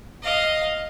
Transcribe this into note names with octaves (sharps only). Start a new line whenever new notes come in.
D#5 F5